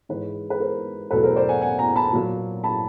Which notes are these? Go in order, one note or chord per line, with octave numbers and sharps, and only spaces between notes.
G#2 E3 G#3 B4 C#5
B4
A#4 C5
E2 B2 F#3 A3 A4 B4
A#4 C5
C5 D5
F#5 G#5
F#5 G#5
G#5 A#5
A5 B5
A#2 F#3 A#3
A5 B5